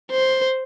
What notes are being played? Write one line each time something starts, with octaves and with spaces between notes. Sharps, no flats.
C5